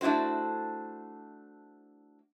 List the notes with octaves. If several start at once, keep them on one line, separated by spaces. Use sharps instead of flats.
A3 D4 E4 F#4 C5